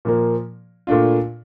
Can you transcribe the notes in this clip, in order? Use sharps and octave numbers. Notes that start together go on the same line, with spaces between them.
A#2 F3 A#3
A#2 A3 D4 F4